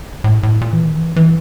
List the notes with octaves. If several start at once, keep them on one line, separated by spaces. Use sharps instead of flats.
A2
A2
A#2
E3
D#3
E3
E3